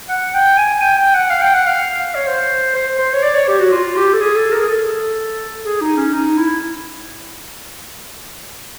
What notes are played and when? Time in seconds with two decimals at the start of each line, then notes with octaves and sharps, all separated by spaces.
0.09 F#5
0.34 G5
0.57 G#5
0.81 G5
0.98 G5
1.14 F#5
1.30 F5
1.42 G5
1.54 F#5
1.66 F5
2.15 C#5
2.27 C5
2.75 C5
2.99 C5
3.14 C#5
3.23 D5
3.35 C#5
3.48 G4
3.59 F#4
3.71 F4
3.96 G4
4.13 A4
4.21 G#4
4.36 A4
4.52 A#4
4.60 G#4
4.68 A4
5.65 G#4
5.81 D#4
5.97 C#4
6.13 D#4
6.37 E4